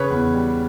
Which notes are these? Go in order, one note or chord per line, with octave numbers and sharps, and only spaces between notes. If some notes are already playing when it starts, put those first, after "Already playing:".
Already playing: C#3 B4 C#5
E2
G3